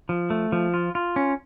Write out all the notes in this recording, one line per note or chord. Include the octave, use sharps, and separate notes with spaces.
F3
A3
F3
F4
F4
C#4